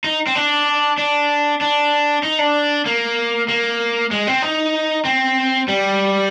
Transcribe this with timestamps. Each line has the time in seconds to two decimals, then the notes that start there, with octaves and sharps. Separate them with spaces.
0.04 D#4
0.27 C4
0.35 D4
0.98 D4
1.61 D4
2.23 D#4
2.39 D4
2.86 A#3
3.48 A#3
4.11 G#3
4.27 C4
4.42 D#4
5.05 C4
5.68 G3